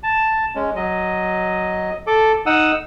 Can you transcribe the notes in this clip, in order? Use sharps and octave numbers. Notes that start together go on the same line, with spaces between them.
A5
G#3 C#4
F#3 D#5
A4 D6
D#4 F#5 D#6 E6